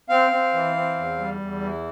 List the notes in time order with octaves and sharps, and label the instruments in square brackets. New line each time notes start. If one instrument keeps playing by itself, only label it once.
[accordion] C4 F5
C4
E3
C4
E2
G3
E2
E3